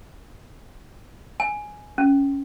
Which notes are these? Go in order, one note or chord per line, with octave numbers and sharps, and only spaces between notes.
G#5
C#4